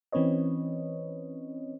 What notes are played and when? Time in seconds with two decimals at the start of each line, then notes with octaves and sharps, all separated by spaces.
0.12 E3 C4 C#4 B4 C#5 D#5